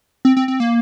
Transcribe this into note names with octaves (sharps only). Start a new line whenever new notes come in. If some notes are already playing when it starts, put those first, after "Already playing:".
C4
C4
C4
A#3